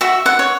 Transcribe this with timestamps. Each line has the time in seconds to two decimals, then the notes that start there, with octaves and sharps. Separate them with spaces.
0.01 F#4 E5
0.26 F#5
0.39 C#5